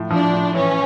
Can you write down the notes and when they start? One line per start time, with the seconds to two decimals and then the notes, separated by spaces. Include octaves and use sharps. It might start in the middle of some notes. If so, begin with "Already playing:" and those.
Already playing: A2 F3
0.10 F3 D4
0.33 A2
0.55 E3 C#4